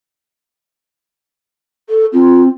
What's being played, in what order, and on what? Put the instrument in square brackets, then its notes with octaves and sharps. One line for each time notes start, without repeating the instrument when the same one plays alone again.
[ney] A4
[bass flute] C4 [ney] F4